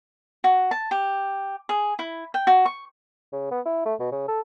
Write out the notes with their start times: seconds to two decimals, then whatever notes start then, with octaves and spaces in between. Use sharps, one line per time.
0.44 F#4
0.71 A5
0.91 G4
1.69 G#4
1.99 E4
2.34 G5
2.47 F#4
2.66 C#6
3.32 C#3
3.51 B3
3.65 E4
3.86 A3
4.00 B2
4.12 C#3
4.28 A4